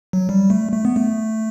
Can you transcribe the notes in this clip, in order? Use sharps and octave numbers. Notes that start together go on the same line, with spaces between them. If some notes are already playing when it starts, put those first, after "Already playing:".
F#3
G3
A3
A3
B3
A3